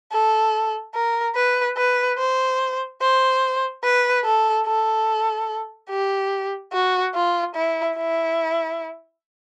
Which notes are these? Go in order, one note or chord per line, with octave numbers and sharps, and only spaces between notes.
A4
A#4
B4
B4
C5
C5
B4
A4
A4
G4
F#4
F4
E4
E4